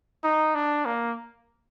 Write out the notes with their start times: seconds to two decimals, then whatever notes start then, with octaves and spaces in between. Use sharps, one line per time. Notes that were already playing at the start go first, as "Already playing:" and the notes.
0.24 D#4
0.55 D4
0.86 A#3